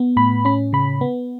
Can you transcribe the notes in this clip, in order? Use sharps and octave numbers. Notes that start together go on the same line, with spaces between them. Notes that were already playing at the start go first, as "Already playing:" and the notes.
Already playing: B3
A2 B5
C#4 B5
C#3 B5
B3